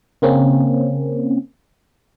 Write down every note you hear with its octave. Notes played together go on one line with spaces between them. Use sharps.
C#3 A#3 C4 C#4